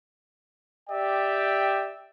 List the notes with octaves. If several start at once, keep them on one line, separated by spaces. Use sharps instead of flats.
G4 D5 E5 G5